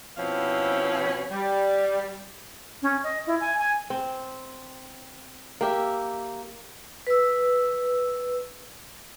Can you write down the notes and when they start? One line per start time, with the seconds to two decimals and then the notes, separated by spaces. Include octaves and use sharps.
0.18 B2 F3 C4 C#4 E4 F5
1.31 G3
2.82 C#4
3.04 D#5
3.27 E4
3.40 G#5
3.58 G#5
3.90 C4
5.61 A#3 G4 E5
7.07 B4 E6